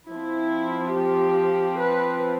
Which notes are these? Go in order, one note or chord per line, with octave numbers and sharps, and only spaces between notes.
F3 C4 E4
G4
B4